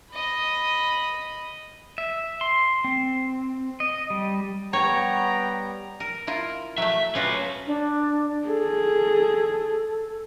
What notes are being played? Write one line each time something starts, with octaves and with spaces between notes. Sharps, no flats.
D#5 B5
E5
C6
C4
D#5
G3
G3 B3 C#5 G5 A#5
A#4
E4 F4 A#4
F#3 A3 E5
C#4 F4 F#4 B4 C#5
D4
G#4 A4